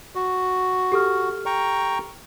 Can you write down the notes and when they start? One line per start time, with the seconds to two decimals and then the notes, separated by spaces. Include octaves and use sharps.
0.15 F#4
0.92 G4 A4 F6
1.46 G5 A#5 C#6